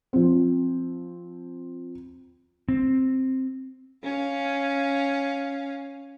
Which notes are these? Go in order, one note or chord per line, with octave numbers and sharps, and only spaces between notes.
F3 C4
C4
C#4 F5